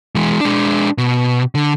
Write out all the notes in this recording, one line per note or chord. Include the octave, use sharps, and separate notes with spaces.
E3 G#3
G#3 D4
B2
D3